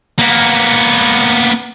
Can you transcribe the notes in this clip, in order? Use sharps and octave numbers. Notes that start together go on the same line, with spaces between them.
A#3 B3